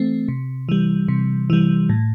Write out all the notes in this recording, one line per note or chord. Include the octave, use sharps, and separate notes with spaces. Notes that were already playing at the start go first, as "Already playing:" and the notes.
Already playing: E3 A3 C4
C3
E3 G3
C3
E3 G3
A2